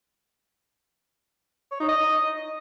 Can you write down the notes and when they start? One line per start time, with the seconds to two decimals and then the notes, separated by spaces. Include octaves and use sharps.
1.72 C#5
1.80 D#4
1.89 D#5